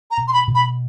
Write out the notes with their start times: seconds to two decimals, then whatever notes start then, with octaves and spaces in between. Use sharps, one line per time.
0.11 A#5
0.18 B2
0.28 C6
0.33 B5
0.47 B2
0.55 B5